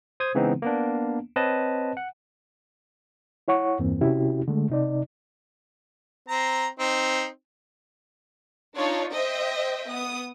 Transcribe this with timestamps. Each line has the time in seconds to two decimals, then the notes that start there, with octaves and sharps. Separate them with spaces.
0.20 C5 D#6 G#6
0.35 C#3 E3 G#3 B3 C4 D#4
0.62 A#3 B3 D4
1.36 C4 B4 C#5 D#5 A5
1.97 F#5
3.48 E4 C#5 F#5 C#6
3.79 E2 G2 E3 A#3 C4
4.01 C3 C#4 E4 F#4 G4
4.48 D3 G#3 A3
4.70 C3 D#4 D5
6.28 C4 A#5
6.79 C4 D#4
8.77 D4 D#4 F4 C#5
9.13 C5 D#5 E5 G5
9.88 B3 D#6